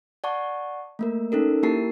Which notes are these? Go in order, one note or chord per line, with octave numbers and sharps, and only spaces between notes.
D5 F#5 A5 C#6 D6
A3 A#3 A#4
C#4 D#4 A4 A#4
A#3 E4 G4 A#4 A5 C7